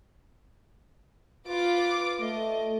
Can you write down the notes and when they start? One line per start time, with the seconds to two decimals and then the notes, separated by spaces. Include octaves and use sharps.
1.49 F4 B4 D6
2.21 A3 D#5